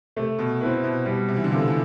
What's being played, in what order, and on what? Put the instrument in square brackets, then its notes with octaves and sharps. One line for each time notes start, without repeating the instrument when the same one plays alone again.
[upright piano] C3 [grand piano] A3
[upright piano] B2
[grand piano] C4 E4 B4
[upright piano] B2
[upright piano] B2 [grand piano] G3
[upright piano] C3
E3
D3
[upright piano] C3 [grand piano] B3 F4 A4
[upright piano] E3